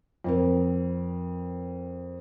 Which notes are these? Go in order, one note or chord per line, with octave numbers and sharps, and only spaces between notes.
F2 C4 A#4